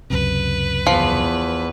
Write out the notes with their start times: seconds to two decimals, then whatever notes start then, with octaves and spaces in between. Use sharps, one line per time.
0.10 C#2 F#2 C3 B4
0.87 E2 F3